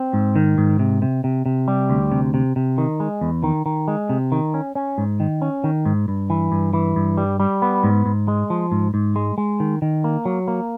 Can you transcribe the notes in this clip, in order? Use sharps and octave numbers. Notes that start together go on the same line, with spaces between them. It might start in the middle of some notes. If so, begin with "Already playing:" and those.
Already playing: C4
G#2
D#3
G#2
C3
C3
C3
C3
G3
D2
C3
C3
C3
D#3
G#3
E2
D#3
D#3
G#3
C3
D#3
C#4
C#4
G#2
D#3
C#4
D#3
G#2
G2
E3
G2
E3
G2
G3
G3
B3
G#2
G#2
G#3
F3
G#2
G#2
G#3
G#3
D#3
D#3
A#3
F#3
A#3